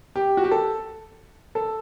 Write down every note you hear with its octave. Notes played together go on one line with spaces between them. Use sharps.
G4
F#4
G4
A4
A4